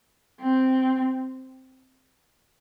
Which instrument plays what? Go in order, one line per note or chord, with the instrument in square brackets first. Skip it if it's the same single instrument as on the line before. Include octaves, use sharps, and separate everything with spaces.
[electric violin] C4